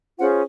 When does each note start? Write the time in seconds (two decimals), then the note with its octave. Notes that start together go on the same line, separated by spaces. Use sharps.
0.19 C#4 F4 G#4 C5 F#5